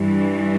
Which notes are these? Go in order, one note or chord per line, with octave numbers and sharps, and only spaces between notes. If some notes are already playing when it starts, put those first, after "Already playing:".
Already playing: G2 E3